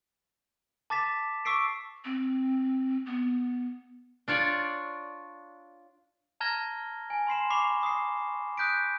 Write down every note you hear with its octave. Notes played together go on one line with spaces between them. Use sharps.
A5 D6 A6 B6 E7
C#6 D6 E6 B6 C7 D7
C4
B3
D4 F4 C#5 D5
A5 A#5 F6 G#6 A#6 G7
G#5
B5 C6 C7 E7
B5 C#6 D6 C7 F7 G7
D#6 C7
D#6 F#6 G6 B6 D7